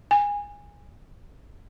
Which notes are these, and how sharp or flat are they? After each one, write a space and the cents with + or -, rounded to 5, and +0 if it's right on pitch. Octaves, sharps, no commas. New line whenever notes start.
G#5 -20